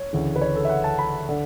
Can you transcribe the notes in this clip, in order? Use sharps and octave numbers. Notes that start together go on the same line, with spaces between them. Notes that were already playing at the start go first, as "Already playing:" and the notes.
Already playing: C#5
D2 C#3 E3
B4
C#5
A4
E5
F#5
A5
B5
D3